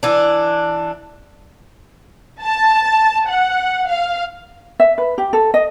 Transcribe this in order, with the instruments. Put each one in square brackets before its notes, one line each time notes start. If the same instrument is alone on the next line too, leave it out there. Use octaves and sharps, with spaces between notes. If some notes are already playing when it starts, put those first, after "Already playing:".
[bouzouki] E3 D4
[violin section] A5
F#5
F5
[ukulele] E5
B4
G4
A4
D#5